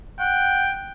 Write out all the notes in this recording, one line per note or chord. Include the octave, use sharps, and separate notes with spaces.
F#5 G5